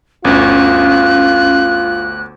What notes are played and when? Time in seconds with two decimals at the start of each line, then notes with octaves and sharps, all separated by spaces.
0.25 G1 D2 C#4 F4 F#6